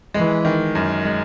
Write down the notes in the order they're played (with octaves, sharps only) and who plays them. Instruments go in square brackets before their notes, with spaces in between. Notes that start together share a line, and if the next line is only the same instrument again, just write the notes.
[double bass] E3 [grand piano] G#3
[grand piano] D#3
F#2
G#3